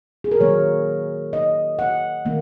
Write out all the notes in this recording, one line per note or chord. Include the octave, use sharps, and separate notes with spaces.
G#4
A#4
D#3 F#3 A#3 C#5
D#5
F#5
D#3 A#3